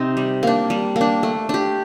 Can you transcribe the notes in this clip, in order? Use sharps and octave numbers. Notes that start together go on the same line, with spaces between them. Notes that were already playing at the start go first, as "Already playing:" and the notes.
Already playing: C3 C4 D#4
G3
A#3 D4
G3
A#3
D4
A3
D4 G4